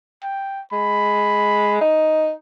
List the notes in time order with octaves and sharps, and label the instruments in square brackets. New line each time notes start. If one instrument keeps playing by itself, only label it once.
[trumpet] G5
[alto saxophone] G#3 [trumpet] B5
[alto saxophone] D#4